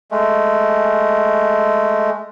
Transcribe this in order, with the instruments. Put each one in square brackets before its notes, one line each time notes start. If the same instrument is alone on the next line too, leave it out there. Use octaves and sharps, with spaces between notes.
[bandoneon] G#3 A3